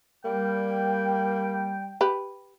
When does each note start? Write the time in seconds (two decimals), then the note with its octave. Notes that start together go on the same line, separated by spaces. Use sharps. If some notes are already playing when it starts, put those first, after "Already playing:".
0.25 G3 A#3 G5
2.01 G4 B4